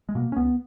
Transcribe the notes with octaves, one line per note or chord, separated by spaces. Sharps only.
G#3
B2 A#3
C#4
C#2 B3